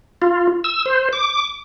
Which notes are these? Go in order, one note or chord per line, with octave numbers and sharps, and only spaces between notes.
F4
E6
C5
D6